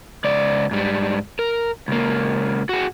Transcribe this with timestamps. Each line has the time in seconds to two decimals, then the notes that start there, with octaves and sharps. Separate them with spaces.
0.24 C#2 D5
0.71 G#2 G3
1.39 A#4
1.88 C#2 A#3
2.69 F#4 G#4